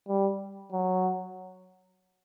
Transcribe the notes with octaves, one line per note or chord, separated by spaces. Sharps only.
G3
F#3